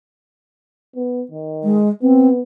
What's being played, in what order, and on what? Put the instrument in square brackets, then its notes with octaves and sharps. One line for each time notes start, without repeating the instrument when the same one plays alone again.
[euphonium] B3
D#3
[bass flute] G#3
[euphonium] B3 [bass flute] C4